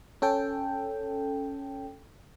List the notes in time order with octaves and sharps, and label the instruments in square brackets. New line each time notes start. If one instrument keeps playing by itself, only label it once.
[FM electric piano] C#4 A4 G5